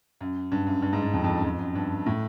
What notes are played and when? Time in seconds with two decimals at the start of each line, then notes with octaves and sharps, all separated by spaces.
0.21 F#2
0.52 G2
0.67 F#2
0.82 G2
0.93 G#2
1.03 G2
1.14 F2
1.24 F2
1.34 F#2
1.44 F2
1.59 F#2
1.75 G2
2.06 A2